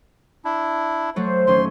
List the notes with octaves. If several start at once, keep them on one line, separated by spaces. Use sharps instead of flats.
D4 E4
F#3 A3 F#4 C5
D#1 F#3 C#4 C6